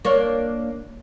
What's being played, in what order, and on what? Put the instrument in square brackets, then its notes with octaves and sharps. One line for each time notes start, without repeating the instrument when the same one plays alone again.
[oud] A#3 D4 C#5